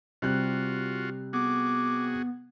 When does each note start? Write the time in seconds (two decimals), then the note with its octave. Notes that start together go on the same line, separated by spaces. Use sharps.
0.22 C3 G3 F4 F#4 F#6
1.33 B3 F#4 G#4 D6